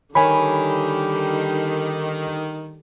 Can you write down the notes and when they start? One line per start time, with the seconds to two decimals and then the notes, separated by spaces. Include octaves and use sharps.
0.15 D3 D#3 G3 C#5 G#5 B5